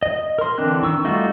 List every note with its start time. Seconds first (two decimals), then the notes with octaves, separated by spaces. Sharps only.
0.03 D#5
0.39 A#4 C6
0.58 D3 E3 C4 D4 F#6
0.82 D#3 C#6 E6
1.04 G3 A3 D#4 F4 F#4